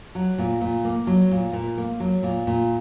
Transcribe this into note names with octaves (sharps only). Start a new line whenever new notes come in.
F#3
A#2
A#2
A#3
F#3
A#2
A#2
A#3
F#3
A#2
A#2